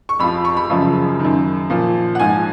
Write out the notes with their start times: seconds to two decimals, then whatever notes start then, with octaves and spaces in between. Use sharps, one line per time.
0.09 C#6
0.19 F2 F3 B5
0.45 C#6
0.57 B5
0.70 F#2 C#3 F3
1.20 F#2 D#3
1.70 A#2 F3
2.15 F#5
2.20 G#2 F3 G#5